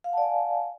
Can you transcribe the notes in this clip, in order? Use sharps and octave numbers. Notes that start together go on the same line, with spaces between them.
D5 F5 F#5 G#5 A5